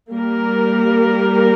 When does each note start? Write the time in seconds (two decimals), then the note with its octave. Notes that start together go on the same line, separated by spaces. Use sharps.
0.12 G3 A#3 G4 A#4